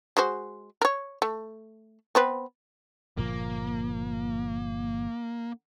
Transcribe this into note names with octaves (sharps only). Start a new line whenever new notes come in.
G#3 F#4 C5
A#4 C#5
A3
B3 C4 B4
G1 A#2 F3 A#3